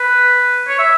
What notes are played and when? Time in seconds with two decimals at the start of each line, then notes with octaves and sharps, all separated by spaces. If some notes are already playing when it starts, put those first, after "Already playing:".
Already playing: B4
0.68 C#5
0.79 E5